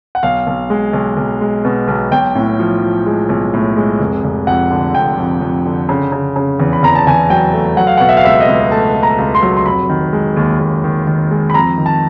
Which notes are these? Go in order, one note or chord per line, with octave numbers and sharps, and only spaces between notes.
F#5
B1 F5
B1
G#3
B1
B1
G#3
B2
B1
B1 G5
A2
F3
F3
G#3
B1
A2
G#3
F1
F1
F2 F#5
D3
F1 G5
F2
F2
D3
C#3
C#3
C#3
E2
B5
E2 A#5
A5
E2 G#5
F#3 G5
A3
F#3 F#5
F5
B2 F#5
E5
F5
C#2 E5
D#5
C#2
A3 A5
A3
A#5
C#2
C6
F#3
C6
F1 B5
D#3
G#3
D#2
D#2
D#3
D#3
G#3
B5
F2 A#5
D#3
A5